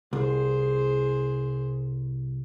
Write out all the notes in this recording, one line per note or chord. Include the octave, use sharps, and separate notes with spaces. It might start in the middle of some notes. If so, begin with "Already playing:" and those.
C2 G#4 C5